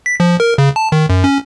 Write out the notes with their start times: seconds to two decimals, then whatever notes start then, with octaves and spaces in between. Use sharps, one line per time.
0.06 B6
0.20 F3
0.40 A#4
0.58 C#3
0.76 A5
0.92 D#3
1.09 F#2
1.24 C#4